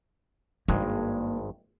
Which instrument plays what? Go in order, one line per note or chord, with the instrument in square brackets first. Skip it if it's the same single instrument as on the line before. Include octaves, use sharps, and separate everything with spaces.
[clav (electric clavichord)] G#1 G2 G#3 [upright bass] A#3